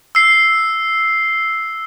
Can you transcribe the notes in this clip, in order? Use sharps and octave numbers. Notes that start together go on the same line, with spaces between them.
E6 C7